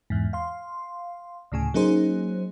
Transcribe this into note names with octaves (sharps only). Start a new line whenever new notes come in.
E2 G#2
F5 C6
D2 A2 C#3 G#5
F#3 A#3 C#4 D#4 G#4 C5